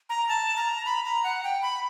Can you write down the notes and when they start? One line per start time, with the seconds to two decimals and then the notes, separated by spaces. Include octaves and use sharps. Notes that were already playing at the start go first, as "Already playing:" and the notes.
0.09 A#5
0.28 A5
0.57 A#5
0.86 B5
1.05 A#5
1.24 F#5
1.43 G5
1.62 B5